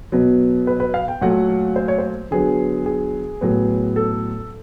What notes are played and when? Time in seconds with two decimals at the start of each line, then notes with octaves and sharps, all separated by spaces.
0.12 B2 F#3 B3
0.67 B4
0.80 B4
0.94 F5
1.08 G5
1.21 A#2 F#3 A3 F#5
1.76 C5
1.88 C#5
1.98 C5
2.31 D3 F#3 B3 G#4
2.86 G#4
3.41 A2 F#3 B3
3.96 A4